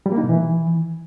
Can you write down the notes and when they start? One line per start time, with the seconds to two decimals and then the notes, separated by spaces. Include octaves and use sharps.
0.06 G3
0.12 A#3
0.17 D#4
0.23 B2
0.29 E3